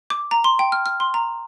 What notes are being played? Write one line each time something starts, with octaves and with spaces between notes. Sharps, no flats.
D6
A#5
C6
G5
F6
F6
C6
A#5